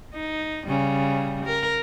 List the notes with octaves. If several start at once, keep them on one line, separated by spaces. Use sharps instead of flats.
D#4
C#3 G3
A#4